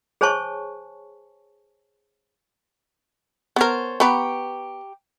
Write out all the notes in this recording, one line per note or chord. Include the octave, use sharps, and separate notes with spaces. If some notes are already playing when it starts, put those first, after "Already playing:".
G#4 C5 C#5 G#5 A5 C#6
B3 A#4 C5 C#5 A5
B3 G4 B4 A#5 C#6